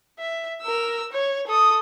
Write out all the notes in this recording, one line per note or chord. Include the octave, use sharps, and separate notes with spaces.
E5
A#4 E6
C#5
A4 D#6